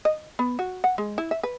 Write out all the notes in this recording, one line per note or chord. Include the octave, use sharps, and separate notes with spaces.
D#5
B3
F#4
F#5
G#3
E4
E5
B4